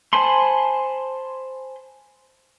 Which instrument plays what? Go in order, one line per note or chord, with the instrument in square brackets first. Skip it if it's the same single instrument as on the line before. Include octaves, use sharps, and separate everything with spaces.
[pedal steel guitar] C5 G#5 A5 B5 C6